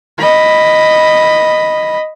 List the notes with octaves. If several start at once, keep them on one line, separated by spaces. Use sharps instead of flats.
D#5 B5